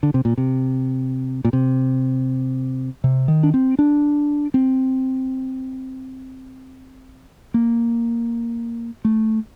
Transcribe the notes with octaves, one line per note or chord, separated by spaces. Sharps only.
D3
C3
A#2
C3
A#2
C3
C3
D#3
D4
C4
D4
C4
A#3
A3